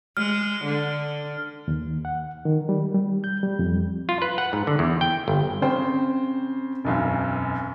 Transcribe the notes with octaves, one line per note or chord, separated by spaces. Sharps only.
G#3 F6
D3
D#2
F#5
D#3
G3
G3
G6
G3
F2
F4
B4
F#5
G#2
D3
E2
G5
G1
C#3 C4 C5 G5
E1 B1 F#2